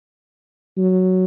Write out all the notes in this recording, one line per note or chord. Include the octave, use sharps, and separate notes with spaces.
F#3